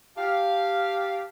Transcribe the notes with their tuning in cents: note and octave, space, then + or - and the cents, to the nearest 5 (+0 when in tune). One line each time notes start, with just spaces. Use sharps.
G4 +0 F5 -5 A5 +0